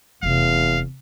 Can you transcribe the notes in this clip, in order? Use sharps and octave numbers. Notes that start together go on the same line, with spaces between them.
F1 E2 C3 F5